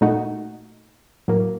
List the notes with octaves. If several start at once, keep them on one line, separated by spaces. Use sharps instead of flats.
A#2 A3 D#4 F#4
A2 F#3 A#3